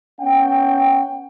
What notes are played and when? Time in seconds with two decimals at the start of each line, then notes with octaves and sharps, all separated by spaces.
0.21 B3 C#4 F#5 G5